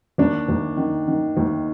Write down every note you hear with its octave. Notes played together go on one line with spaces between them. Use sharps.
D#2 D4
D#2
D#3
D#3
D#2